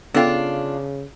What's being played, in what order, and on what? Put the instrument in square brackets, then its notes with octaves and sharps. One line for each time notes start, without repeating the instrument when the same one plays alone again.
[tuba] C#3 [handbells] B3 A4 G5 [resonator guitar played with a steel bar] D4 F4